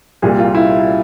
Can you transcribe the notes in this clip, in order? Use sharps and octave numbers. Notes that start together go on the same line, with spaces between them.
C2 A#2 G3 G#4
F4
E4